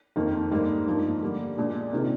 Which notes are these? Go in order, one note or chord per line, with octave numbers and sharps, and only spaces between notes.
F2 D#3 A#3
G#2 G3 A#3 D#4
G2 F3 A#3 D#4
D3 G3 A#3
A#2 G#3 D4 G#4
C3 D#3 A#3 F4 G#4